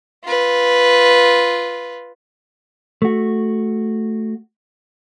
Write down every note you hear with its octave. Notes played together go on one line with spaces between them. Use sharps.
F4 B4
A3 F#4